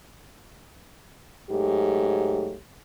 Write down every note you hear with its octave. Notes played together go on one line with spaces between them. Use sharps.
G#2 F#3 A3 G4